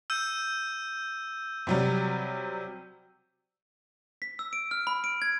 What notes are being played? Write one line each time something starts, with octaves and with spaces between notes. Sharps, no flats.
E6 G6 D#7
C3 F#3 G3
B6
E6
D7
F6
B5
D7
G#6